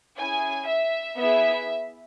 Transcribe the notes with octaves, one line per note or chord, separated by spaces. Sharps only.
C#4 E4 G#4 G#5
E5
B3 E4 G#4 E5